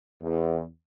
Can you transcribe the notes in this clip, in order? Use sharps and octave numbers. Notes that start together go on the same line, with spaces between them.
E2